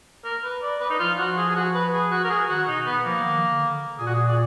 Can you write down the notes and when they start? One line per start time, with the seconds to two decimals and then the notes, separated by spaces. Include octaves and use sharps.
0.24 A#4
0.44 B4
0.62 D5
0.80 B4
0.90 D#4
0.99 F3 F4
1.18 F#4
1.37 G#4
1.48 G#4
1.56 F#4
1.74 B4
1.92 G#4
2.11 F#4
2.24 A#4
2.30 G#4
2.49 D#3 F#4
2.67 B2 D#4
2.86 B3
3.04 F3 A#3
3.23 D#3
3.48 D3
3.98 A#2 G#4
4.07 F#4
4.14 G#4
4.28 D5